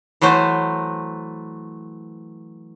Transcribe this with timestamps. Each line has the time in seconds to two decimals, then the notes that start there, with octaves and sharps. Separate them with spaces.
0.21 E3 F#3 A3 C5